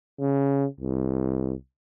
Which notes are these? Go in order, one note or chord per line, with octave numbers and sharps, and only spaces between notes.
C#3
C2